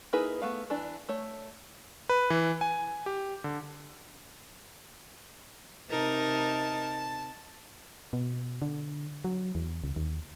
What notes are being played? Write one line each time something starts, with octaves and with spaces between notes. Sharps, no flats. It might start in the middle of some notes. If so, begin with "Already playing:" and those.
A#3 D#4 E4 G#4 B4
A3 B3 F5
E3 D4 D5
A3 C#5
B4
E3
G#5
G4
D3
C3 D#4 A#4 A5
B2
D3
F#3
E2
C#2
D#2